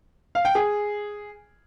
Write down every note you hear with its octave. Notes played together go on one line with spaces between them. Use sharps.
F5
G5
G#4